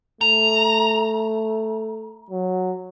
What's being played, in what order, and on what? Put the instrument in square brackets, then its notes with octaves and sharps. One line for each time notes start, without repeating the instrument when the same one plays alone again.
[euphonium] A3 [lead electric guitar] A#5
[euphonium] F#3